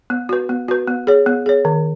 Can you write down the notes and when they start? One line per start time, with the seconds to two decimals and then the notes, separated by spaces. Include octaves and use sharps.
0.10 B3
0.29 F#4 B4
0.49 B3
0.68 F#4 B4
0.87 B3
1.07 G#4 C#5
1.26 B3
1.46 G#4 C#5
1.65 D#3